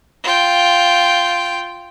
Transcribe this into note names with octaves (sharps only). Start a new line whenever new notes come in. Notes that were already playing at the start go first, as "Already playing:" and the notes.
F4 G5